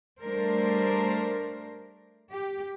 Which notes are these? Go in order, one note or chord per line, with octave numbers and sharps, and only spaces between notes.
G3 A3 D4 A#4 C5
G4